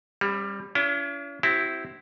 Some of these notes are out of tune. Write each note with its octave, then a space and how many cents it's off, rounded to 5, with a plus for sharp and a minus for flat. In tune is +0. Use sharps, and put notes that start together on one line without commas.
G3 +15 C#4 -40
C#4 +45 E4 +45
C4 +0 E4 +0 G4 -45